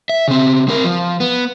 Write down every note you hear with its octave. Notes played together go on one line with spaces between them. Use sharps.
E5
C#3 C4
C4 A#4
F3
B3